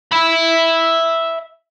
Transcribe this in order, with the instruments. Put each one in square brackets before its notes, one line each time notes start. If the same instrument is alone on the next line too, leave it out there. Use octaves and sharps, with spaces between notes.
[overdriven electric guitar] E5 B5